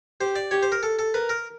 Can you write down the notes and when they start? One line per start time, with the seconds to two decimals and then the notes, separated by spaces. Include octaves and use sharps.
0.21 G4 C5
0.36 D5
0.51 G4 C#5
0.63 C5
0.72 A#4
0.83 A4
0.99 A4
1.14 A#4 B4
1.29 A#4